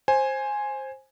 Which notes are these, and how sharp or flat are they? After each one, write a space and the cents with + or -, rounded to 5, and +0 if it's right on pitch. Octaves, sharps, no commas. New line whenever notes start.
C5 +15 G#5 +0